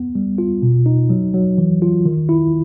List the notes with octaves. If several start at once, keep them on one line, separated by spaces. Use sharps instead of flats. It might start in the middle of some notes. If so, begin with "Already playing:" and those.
Already playing: B3
G3
F4
B2
D#4
F#3
F#3
E3
F4
D#3
E4